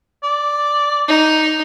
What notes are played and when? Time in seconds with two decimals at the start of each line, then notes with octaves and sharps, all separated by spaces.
0.24 D5
1.08 D#4